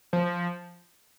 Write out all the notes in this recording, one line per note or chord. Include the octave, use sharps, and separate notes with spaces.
F3